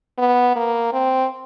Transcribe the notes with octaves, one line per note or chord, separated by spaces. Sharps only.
B3
A#3
C4